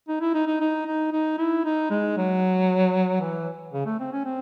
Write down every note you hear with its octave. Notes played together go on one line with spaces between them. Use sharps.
D#4
E4
D#4
D#4
D#4
D#4
D#4
E4
D#4
G#3
F#3
E3
C#3
A3
C4
C#4
C4